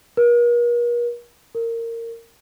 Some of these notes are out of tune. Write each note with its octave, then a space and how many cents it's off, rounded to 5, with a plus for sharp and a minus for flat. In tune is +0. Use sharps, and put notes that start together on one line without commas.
A#4 +45
A#4 -20